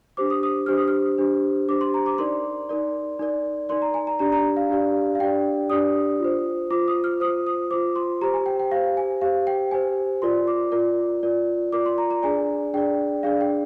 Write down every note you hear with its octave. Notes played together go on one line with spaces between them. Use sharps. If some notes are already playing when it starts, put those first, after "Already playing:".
D4 G4 C5 D6
D#6
D#6
D4 G4 C5 F6
D#6
F6
D4 G4 C5
D4 G4 C5 D6
C6
A#5
D6
D#4 A#4 D5 C6
D#4 A#4 D5
D#4 A#4 D5
D#4 A#4 D5 C6
A#5
G#5
A#5
D4 G4 D5 A#5
A#5
F5
D4 G4 D5
F5
D4 G4 D5 G5
D4 G4 D5 D#6
F4 C5
F4 C5 D6
D#6
F6
F4 C5 D#6
D#6
F4 C5 D6
C6
G4 C5 A#5
G#5
G5
G5
G4 C5 F5
G#5
G4 C5 F5
G5
G4 C5 G#5
F4 A#4 D5 C6
D6
F4 A#4 D5
F4 A#4 D5
F4 A#4 D5 D6
C6
A#5
A#5
D4 G#4 D5 G#5
D4 G#4 D5 G5
D4 G#4 D5 F5
G5